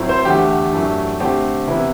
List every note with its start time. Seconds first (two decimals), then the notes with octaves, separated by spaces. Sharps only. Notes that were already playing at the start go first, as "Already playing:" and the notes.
Already playing: A2 F#3 C4 E4
0.09 C5
0.25 E2 D3 A3 G4
0.73 F#2 E3 A3 D4
1.20 D3 A3 C4 G4
1.67 C3 E3 B3 E4